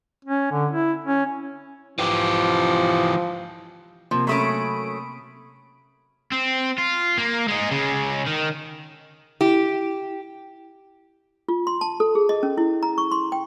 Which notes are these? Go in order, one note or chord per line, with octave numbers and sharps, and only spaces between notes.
C#4
D3
E4
C#4
E3 F3 G4
C3 F3 A#3
F#3 A3 C#4 B5 D#6 D7
C4
F4
A#3
G#3 D#4
C#3 G#3
D#3
E4 G4
F4
C6
A5
A4
G#4
D#5
C#4
E4
A#5
C#6
C6
G5